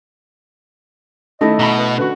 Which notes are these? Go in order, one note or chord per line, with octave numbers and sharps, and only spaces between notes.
D#3 A3 E4 D#5
B2 A#5 B5
B4 F#5
D3 F#4 B4